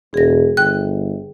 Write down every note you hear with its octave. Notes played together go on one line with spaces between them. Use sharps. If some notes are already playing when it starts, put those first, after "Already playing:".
E1 G#4 A#6
G1 G5 F#6